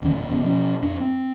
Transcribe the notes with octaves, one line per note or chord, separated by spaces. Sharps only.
E1 D2 D#3 C#4
E1 A#2
E1 E2 C#3 B3
B2 F3 C#4
F2 D4
C4